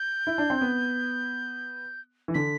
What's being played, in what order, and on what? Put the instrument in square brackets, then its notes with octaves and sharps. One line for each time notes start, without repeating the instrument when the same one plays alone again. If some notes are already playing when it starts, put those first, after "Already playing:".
Already playing: [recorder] G6
[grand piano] E4
D4
C4
B3
E3
[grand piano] D3 [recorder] B6